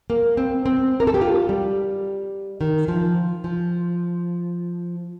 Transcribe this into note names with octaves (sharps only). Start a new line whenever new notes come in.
A#3
C4
C4
A#4
A4
G4
F4
G3
D#3
F3
F3